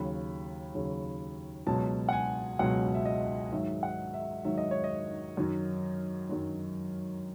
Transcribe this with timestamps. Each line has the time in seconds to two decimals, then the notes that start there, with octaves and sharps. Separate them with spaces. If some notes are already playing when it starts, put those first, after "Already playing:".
Already playing: D#2 C#3 F#3 B5
0.75 D#2 C#3 F#3
1.67 C#2 B2 F#3 A5
2.09 F#5
2.13 G#5
2.59 C#2 B2 F#3 F#5
2.95 E5
3.05 D#5
3.52 G#2 D#3 F#3 E5
3.83 F#5
4.14 E5
4.45 G#2 D#3 F#3 E5
4.58 D#5
4.71 C#5
4.84 D#5
5.37 F#2 D#3 F#3
6.29 F#2 D#3 F#3